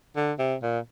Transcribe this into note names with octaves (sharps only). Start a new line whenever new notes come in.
D3
C3
A#2